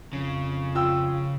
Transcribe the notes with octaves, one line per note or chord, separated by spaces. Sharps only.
F2 C#3
F4 G5 E6